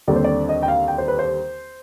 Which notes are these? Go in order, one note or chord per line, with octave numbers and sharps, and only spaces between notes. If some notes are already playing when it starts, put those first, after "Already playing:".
D#2 D3 G3 C4 D5
C5
D5
D#5
G5
F5
G5
C5
B4
C5